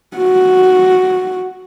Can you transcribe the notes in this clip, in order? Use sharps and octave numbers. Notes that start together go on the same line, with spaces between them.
F#4